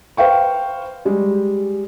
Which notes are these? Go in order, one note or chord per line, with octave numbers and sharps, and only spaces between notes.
B4 C5 F5 G5 C#6
G3 G#3